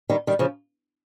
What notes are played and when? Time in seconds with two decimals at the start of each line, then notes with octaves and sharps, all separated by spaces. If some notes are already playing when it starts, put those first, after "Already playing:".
0.10 D#3 G3
0.27 D#3 G3
0.39 C#3 F3